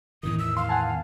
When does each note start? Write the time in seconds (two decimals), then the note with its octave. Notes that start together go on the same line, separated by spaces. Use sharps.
0.23 E2 A2 D#3 D#6
0.39 E6
0.57 F5 C6
0.69 F#5 G#5 A5